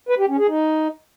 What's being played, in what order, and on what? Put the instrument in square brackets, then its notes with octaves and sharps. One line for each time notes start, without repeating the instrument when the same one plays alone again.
[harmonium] B4
G4
C#4
G#4
D#4